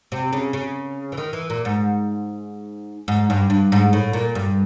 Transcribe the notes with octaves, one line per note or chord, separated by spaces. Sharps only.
C3
C#3
C#3
E3
D#3
E3
A#2
G#2
G#2
G2
G2
G#2
A2
A#2
G2